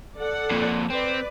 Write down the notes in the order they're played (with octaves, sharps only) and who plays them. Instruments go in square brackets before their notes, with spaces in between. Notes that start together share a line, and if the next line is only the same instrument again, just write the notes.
[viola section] A4 D5 F#5
[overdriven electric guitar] F2 A#2
[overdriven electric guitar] C4 [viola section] B4 D5